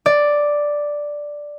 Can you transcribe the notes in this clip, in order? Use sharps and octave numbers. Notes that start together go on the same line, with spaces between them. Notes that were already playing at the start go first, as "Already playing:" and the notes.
D5